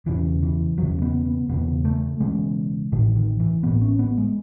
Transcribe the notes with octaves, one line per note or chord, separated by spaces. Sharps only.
E1 E2 C#3 E3
E3
E1 E2 C#3 F#3
B3
B3
E1 E2 C#3 B3
A3
E1 E2 C#3 G#3
A1 A2 D#3
D#3
E3
A1 A2 B3
C#4
B3
G#3